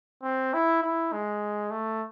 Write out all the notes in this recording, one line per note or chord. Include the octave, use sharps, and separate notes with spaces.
C4
E4
E4
G#3
A3